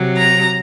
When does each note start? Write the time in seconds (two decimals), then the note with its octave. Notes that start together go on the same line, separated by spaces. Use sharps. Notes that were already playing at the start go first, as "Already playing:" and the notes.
Already playing: C3 F#3
0.18 A#5